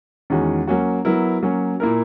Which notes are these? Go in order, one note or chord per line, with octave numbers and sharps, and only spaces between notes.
E2 D#3 G#3 C#4 F#4
F#3 A#3 C#4 F#4
F#3 B3 E4 A#4
F#3 A#3 C#4
A#2 A#3 E4 A#4